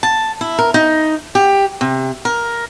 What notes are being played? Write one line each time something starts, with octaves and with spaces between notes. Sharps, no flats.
A5
E4
A#4
D#4
G4
C3
A#4